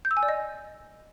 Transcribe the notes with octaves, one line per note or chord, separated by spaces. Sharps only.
G6
E6
G#5
D5
D#5